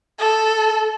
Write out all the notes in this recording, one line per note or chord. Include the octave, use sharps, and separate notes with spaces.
A4